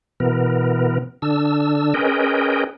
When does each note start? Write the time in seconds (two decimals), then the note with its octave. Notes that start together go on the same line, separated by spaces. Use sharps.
0.20 B2 E3 B3 A#4
1.22 D3 D4 E6
1.94 C#4 G#4 A#4 B4 D#5 G5